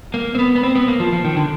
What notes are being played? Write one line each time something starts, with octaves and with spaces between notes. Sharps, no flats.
A#3
C4
B3
B3
C4
B3
A#3
F3
F3
D#3
D3